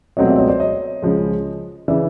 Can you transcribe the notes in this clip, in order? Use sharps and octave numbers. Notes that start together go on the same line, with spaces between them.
C#2 B2 F#3 A3 C4 C#5 D#5
D5 E5
C#5 D#5
C5 D5
C#5 D#5
C#2 C#3 F3 G#3
C#3 E3 D5 E5